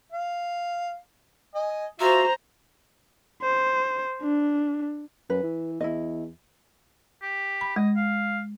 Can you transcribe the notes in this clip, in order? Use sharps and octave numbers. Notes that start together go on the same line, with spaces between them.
F5
D#5 G#5
F4 F#4 C5 E5 A#5
C5
D4
F#2 B4
E3
E2 E4 D#5
G4
B5
G#3 D#5
F5